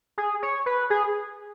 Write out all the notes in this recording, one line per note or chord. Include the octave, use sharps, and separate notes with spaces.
G#4
C#5
B4
G#4